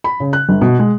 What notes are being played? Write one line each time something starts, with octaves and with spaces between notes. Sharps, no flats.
B5
C#3
F#6
G1
B2
G#3